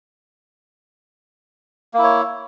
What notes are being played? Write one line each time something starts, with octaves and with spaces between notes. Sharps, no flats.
A#3 E4 C#5